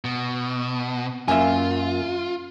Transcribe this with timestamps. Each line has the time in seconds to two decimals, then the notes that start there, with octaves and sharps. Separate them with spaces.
0.05 B2
1.28 F#2 A#3 F4 E5 G#5